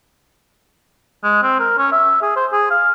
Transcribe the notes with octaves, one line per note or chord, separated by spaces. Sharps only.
G#3
C4
A#4
C#4
E5
G#4
C5
G#4
F5